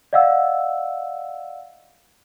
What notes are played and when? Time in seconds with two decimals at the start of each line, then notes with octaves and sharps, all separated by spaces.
0.13 D5 D#5 F5 F#5 E6